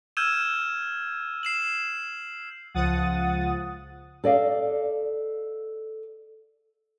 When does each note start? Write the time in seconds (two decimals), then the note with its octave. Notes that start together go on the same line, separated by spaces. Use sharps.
0.17 E6 F6 G6 G#6 D#7 E7
1.43 C7 E7 F#7
2.74 C#2 F3 F#5 D#6 A6
4.24 A4 D5 D#5 F5